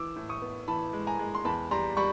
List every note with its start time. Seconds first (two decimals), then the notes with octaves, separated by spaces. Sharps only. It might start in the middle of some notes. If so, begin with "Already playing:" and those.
Already playing: E3 D6 E6
0.16 A2
0.29 C#6 D#6
0.42 B3
0.68 E3 A5 B5
0.93 G#3
1.07 G#5 A#5
1.19 G#3
1.35 C6
1.45 E2 A5 B5
1.71 G3 A#5 C6
1.97 G3 B5 C#6